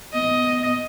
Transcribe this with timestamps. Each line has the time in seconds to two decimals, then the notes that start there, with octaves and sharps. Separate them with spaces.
0.14 B3 D#5